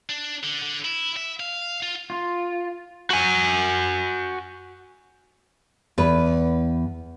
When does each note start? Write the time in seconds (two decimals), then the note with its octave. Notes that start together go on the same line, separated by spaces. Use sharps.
0.09 D4
0.43 D3
0.62 D3
0.84 E4
1.17 E5
1.40 F5
1.83 F4
2.10 F4
3.10 F#4 G#5
5.98 E2 B4